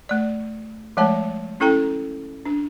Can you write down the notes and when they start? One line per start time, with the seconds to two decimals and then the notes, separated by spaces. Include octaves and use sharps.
0.09 A3 D5
0.97 F3 G#3 A3 C#5 A5
1.60 C#4 E4 A4 G5 A#5
2.45 D4